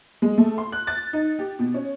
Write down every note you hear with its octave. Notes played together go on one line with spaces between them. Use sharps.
G#3
A3
C6
F#6
A6
D#4
G4
B2
C#4